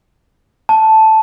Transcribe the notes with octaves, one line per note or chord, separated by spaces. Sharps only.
A5